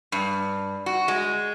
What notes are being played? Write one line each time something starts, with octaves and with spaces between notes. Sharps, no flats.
G2
F#4
G#3